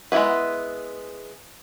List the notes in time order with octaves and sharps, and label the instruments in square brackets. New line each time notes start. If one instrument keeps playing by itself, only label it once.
[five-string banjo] G#3 B3 E4 G#4 B4